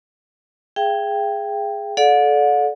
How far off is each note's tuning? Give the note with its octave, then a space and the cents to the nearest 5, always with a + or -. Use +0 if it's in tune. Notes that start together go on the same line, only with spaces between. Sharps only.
G#4 +0 E5 +45 G5 +0
A4 -30 D5 -5 F#5 -45